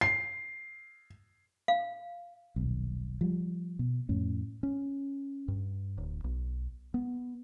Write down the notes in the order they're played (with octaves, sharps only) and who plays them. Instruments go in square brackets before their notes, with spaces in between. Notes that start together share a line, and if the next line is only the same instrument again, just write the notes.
[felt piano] C7
[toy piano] F5
[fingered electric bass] D#1 B1
F3 G3
B2
F2 A2 C#4
C#4
G2
D1
B1
B3